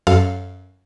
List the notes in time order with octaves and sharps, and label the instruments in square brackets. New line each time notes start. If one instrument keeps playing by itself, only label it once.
[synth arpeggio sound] F#2 A4 F5